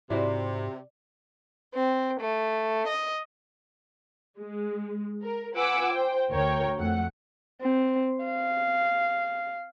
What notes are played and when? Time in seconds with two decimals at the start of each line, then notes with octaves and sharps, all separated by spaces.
0.10 G#2 C3 E4 F#4 C5 D5
1.74 C4
2.19 A3
2.88 D#5
4.38 G#3
5.23 A#4
5.54 F4 B4 F#5 G#5 D6 E6
5.92 C5 G5
6.30 D2 A#4 C#5 G5
6.78 F2 A3 F#5
7.62 C4
8.25 F5